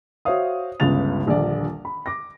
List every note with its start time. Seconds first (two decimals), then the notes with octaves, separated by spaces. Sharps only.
0.25 F#4 C5 C#5 E5 F5 D#6
0.80 G1 C#2 C#3 A6 F7
1.26 D#1 A#1 D3 D5
1.85 B5
2.06 D6 A#6